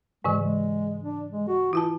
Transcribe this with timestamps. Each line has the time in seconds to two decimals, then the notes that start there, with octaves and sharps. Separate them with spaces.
0.25 G#2 C#3 E3 G#3
0.42 G#3
1.03 D4
1.31 G#3
1.48 F#4
1.73 E3 E4 F4 A5